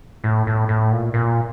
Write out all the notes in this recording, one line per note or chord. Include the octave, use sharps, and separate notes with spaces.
A2
A2
A2
A#2
A#2